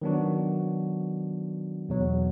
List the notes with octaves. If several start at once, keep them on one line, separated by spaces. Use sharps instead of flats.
D#3 F#3 B3 D4 F#4
E2 B2 F#3